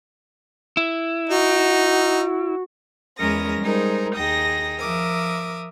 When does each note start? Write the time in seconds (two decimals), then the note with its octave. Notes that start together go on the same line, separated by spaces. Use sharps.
0.77 E4
1.29 D#4 F#4
3.17 E2 G#3 C#4 A#4 D#6 A#6
3.60 G3 G#3 D#4 G#4 A#4 C5
4.16 D#2 D#4 G#4 G5 D#6 A#6
4.80 F3 A#4 E5 D6 D#6